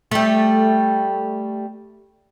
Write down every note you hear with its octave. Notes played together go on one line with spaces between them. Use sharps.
G3 A3